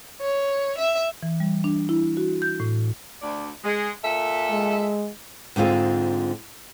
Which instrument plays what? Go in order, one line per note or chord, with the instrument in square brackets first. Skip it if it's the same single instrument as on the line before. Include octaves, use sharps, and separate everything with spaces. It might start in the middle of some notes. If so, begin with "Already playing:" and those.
[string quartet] C#5
E5
[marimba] E3
G3
D4
E4
F#4
G6
A2
[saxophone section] D2 D5
G#3
A#2 A4 E5
[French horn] G#3
[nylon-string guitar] G#2 D3 C4 F4 G#4